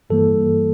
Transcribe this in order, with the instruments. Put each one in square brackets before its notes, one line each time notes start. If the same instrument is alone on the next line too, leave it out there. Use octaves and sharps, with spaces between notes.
[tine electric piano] G2 E3 G3 A#3 A4